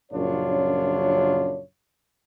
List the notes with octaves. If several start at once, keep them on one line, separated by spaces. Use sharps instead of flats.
A#1 F#2 C#3 D4 F4 C#5